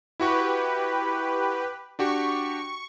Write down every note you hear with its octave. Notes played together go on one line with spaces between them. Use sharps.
E4 F#4 G4 B4 C#6
D4 F#4 G4 C#6